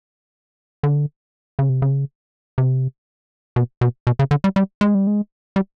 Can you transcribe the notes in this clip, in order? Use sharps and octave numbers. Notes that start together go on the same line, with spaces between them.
D3
C#3
C3
C#3
C3
B2
B2
B2
C#3
D3
G3
G3
G#3
G3
G#3
G3